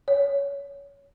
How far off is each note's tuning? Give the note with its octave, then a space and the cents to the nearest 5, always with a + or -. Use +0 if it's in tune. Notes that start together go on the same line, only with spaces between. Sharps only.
C#5 +20